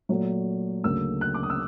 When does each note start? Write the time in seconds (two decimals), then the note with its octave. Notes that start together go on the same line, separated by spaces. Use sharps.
0.09 A#2 F#3 A3
0.84 D2 C#3 F#3 A#3 E6
1.21 F#6
1.34 D6
1.43 D#6
1.50 E6